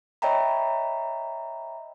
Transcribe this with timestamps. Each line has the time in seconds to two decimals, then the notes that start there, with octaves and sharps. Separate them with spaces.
0.22 C#5 D#5 E5 G5 A#5 B5